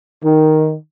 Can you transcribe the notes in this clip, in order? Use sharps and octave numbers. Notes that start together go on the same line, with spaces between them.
D#3